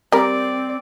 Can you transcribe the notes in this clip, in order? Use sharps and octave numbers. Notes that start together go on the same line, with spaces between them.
G3 C4 A#4 D5